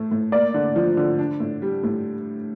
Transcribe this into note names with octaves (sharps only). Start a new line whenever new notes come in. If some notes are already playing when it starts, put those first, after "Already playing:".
Already playing: A2 A3
A2
A#3 D5
D3
F3
D3
D4
A2
G3
A2